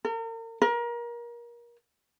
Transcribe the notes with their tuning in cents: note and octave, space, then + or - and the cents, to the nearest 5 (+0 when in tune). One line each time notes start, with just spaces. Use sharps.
A#4 -40
A#4 +30